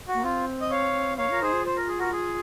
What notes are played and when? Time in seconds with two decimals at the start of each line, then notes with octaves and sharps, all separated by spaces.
0.08 F#4
0.14 A#3
0.24 C4 F4
0.61 D#5
0.70 C#5 F5
1.18 A#3 C#5 F5
1.30 F4 A#4
1.41 D#4 G#4 C5
1.53 F4
1.65 C5
1.77 A#4
1.88 G#4
1.99 F#4 A#4
2.12 G#4